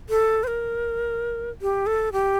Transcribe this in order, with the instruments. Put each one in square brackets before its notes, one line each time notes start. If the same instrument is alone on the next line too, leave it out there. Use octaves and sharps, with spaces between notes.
[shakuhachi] A4
C5
A#4
G4
A4
G4